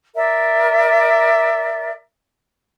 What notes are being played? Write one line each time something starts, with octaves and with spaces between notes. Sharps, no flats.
A#4 D5 E5